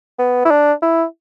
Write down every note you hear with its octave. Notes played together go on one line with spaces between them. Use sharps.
B3
E4
D4
E4